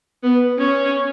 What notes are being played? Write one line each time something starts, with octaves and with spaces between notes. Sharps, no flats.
B3
C#4